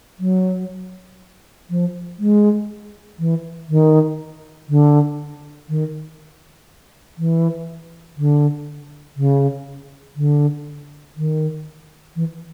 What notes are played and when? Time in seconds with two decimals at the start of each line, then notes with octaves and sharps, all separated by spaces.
0.19 F#3
1.70 F3
2.19 G#3
3.19 E3
3.69 D#3
4.69 D3
5.69 D#3
7.18 E3
8.17 D3
9.17 C#3
10.17 D3
11.17 D#3
12.16 E3